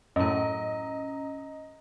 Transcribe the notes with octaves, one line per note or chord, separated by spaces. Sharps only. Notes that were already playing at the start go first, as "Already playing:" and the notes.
F#2 A2 C#4 D#5 A#5